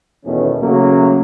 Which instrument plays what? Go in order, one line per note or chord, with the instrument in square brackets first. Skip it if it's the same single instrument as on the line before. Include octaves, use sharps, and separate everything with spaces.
[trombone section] E2 B2 D#3 A3 C#4
C#3 F#3 A3 A#3